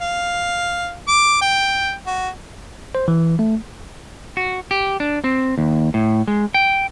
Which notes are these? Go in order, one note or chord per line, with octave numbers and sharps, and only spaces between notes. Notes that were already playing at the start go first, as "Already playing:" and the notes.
F5
D6
G5
F#4
C5
E3
A3
F#4
G4
D4
C4
D#2
A2
G#3
G5